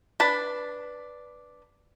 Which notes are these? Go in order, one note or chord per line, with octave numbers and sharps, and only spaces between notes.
D4 B4 A5